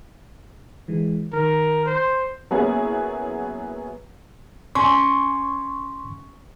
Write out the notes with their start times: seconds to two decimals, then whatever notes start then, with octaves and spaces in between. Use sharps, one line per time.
0.88 E3 G#3
1.33 D#3 A#4
1.86 C5
2.51 F#3 A#3 B3 C#4 E4 G#4
4.75 C#4 C6 C#6